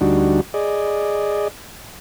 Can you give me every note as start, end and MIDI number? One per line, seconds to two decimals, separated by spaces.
0.01 0.41 38
0.01 0.41 55
0.01 0.41 62
0.01 0.41 63
0.01 0.41 66
0.54 1.48 68
0.54 1.48 74
0.54 1.48 75